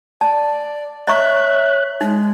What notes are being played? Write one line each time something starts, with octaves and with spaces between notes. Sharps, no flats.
D5 A5
C#5 D#5 E5 A#5 C#6 F#6
G#3 D#4